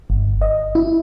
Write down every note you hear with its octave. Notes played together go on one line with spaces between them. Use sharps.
G1
D#5
E4